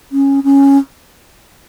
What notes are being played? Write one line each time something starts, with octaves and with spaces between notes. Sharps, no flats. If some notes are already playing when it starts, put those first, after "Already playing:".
C#4
C#4